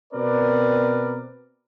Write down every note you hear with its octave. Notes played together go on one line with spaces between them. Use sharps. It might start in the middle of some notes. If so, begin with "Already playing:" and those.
B2 C4 A#4 B4 D5